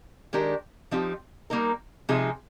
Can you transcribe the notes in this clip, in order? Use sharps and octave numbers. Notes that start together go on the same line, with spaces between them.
D#3 G#3 D4 G4 A#4
F3 C4 D#4 G4
G3 A#3 D#4 A#4
C3 F3 G#3 D#4 G#4